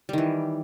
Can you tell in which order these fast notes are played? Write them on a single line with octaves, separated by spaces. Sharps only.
G3 D#3 E3